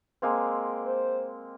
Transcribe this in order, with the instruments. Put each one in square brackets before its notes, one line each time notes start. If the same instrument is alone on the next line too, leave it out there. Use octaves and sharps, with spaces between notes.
[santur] G#3 A#3 C4
[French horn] C5